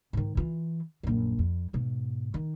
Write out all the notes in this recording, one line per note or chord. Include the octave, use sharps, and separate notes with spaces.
G#2 D#3
E3 F4
A#1 F#2
F2
G#2 B2
D#3